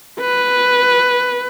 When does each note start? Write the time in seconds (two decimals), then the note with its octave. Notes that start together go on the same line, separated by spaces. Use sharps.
0.20 B4